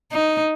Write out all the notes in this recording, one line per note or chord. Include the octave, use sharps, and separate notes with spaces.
D#4